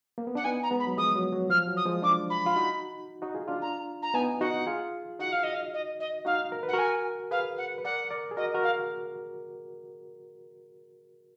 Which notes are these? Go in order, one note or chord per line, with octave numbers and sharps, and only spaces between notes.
A#3
B3
D4 F#5
B3 D#4 G#5
A#5
G#3 B3
B5
F#3
F3 G#3 D#6
F#3
F#3
F3 F6
F#3
D#6
F3 G#3
D4 F4 D6
B5
F4
D#4 F#4
D#4 F#4
F4 G#4
D4 F4
A#5
A#5
B3 D#4 G#5
D#4 F#4 F#5
F4 G#4
D#4 F#4 F#5
F5
D#5
F5
D#5
D#5
D#4 F#4 F5
A#4
B4
F#5
F#4 A#4 G#5
G#4 B4 F5
F#5
B4
A#4 D5 F#5
A#4 D5
G#4
F#4 A#4 D#5
F#4 A#4
F5